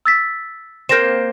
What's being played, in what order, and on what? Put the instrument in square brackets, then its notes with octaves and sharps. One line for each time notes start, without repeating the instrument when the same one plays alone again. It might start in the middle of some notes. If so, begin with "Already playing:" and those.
[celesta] E6 A6 B6
[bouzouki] A#3 C4 [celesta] G6 A#6 E7